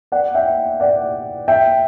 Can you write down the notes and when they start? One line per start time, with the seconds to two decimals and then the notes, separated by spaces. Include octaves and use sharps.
0.12 D5 F#5
0.35 E5 G5
0.80 D5 F#5
1.48 E5 G5